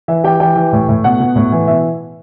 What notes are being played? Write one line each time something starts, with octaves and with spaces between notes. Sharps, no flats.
E3 E5
E3 G4 G5
E3 G4 G5
E3
A2
A2
B2 F#5
B2
A2
E3
B2 E5